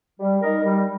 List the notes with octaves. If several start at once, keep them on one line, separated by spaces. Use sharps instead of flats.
G3
D#4 A#4
G3